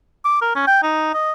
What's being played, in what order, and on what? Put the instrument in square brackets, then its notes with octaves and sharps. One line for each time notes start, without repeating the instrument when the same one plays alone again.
[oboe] D6
A#4
C#4
G5
D#4
D#5